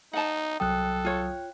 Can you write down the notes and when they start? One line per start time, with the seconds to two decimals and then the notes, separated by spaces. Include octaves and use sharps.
0.13 D#4 F#5 A5
0.60 C2 F#3 A4 G5 D#6 F#6
1.05 F4 C#5